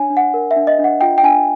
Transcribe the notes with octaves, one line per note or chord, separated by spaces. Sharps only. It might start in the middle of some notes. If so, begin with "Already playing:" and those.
Already playing: D4 C#5 G#5
D4
F#5
A#4
E5
D4
D#5
D4
F#5
F4 G5
G5
D4 G#5